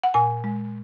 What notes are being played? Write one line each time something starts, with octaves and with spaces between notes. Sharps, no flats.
F#5
A#2 G#5
G#3